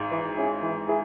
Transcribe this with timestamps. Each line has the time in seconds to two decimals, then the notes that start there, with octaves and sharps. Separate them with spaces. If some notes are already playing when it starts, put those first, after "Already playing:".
Already playing: G#1 G#2
0.11 E3
0.37 G#3 C#4 E4 G#4
0.62 E3
0.89 E4 G#4